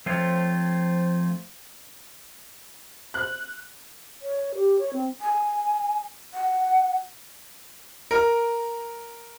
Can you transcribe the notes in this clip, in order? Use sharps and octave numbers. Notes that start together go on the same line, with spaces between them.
F3 A3 C4 F4 C#5
F#6
C#5
G4
C#5
C4
G#5
F#5
A#4